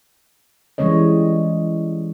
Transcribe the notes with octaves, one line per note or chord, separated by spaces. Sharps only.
E3 G3 G#3 C#4 C#5 D#5